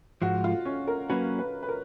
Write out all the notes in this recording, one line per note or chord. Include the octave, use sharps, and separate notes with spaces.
G#2 F3 G#3 F#4
F4
C#4
A#4
F#3 A#3 C#4 F#4 B4
B4
B4
A#4